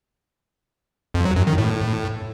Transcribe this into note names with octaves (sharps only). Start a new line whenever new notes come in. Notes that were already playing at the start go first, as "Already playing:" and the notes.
F2
F#3
F#2
D#3
A2